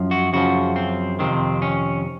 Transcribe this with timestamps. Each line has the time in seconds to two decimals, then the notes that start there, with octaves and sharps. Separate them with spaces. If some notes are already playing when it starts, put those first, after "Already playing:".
Already playing: F#2 F3
0.11 F#4
0.33 F#2 C#3 F3 F#4
0.76 C4
1.19 F2 C3 D#3 C4
1.62 C#4